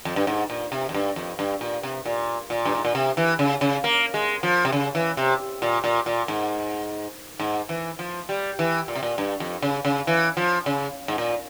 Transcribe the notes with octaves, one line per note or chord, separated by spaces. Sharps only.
F2
G2
G#2
A#2
C3
F2
G2
F2
G2
A#2
C3
A#2
A#2
G2
G#2
A#2
C3
E3
C#3
C#3
A#3
G#3
F3
C3
C#3
E3
C3
A#2
A#2
A#2
G#2
G#2
E3
F3
G3
E3
A#2
C3
A#2
G2
F2
C#3
C#3
E3
F3
C#3
G#2
A#2